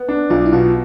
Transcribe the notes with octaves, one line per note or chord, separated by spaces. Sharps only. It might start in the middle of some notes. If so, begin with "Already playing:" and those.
Already playing: B3
D4
B1 F4
E4
B2 F4